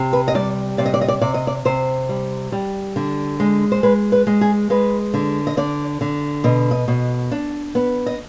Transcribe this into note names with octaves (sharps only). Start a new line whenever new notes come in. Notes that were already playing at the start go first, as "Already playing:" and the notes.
Already playing: C3
B4
D#5
G3 D5
C3 D5
D#5
D5
D#5
D5
C3 D5
D#5
D5
C3 C5
G3
G3
D3
G#3
C5
G#3 B4
B4
G#3
G#4
G#3 B4
D3
D#5
D3 D5
D3
B2 D#5
D#5
B2
D4
B3
D#5